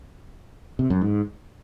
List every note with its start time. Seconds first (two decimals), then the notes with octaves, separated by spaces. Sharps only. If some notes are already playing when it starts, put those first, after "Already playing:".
0.79 C3
0.90 F#2
1.02 G#2